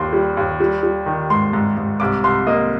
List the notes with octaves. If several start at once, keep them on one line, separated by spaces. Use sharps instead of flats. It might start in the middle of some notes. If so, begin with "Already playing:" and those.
Already playing: D#2 G3 A#3 C6
G3
D#2
G3
G3
D#3
G#2 C6
G#2
G#2
C2 D6
C2 C6
A#3 D#5